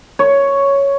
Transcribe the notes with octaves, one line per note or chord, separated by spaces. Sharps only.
C#5